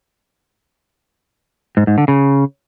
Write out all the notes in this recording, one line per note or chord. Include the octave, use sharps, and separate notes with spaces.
G#2
G#2
D3
C#3